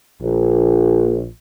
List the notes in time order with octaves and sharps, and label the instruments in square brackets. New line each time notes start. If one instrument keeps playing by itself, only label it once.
[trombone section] A#1